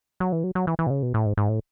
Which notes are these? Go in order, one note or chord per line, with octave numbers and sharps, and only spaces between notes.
F#3
E3
F#3
F#3
E3
E3
B2
C#3
B2
A2
G#2
G#2
A2